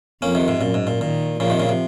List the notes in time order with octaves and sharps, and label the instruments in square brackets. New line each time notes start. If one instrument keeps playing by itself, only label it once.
[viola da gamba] F2 [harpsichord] A#3 C#4
[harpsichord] C3 D#3
G#2 C3
[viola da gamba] F#2 [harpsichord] A#2
[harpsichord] G#2
A#2
[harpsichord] A#2 [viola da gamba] D#3
[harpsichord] A#2 C#3 [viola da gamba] F3
[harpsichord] C3 D#3
A#2 C#3
C3